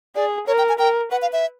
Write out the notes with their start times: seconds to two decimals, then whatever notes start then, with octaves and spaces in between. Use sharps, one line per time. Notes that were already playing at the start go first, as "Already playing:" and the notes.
0.16 G#4 D5
0.47 A#4 C#5
0.58 G5
0.69 G#5
0.79 A#4 G5
1.11 B4 F#5
1.22 F5
1.33 E5